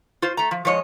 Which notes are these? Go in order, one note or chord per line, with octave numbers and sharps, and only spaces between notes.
F4 C5
A3 A#5
F3
F3 G#3 C#5 D#5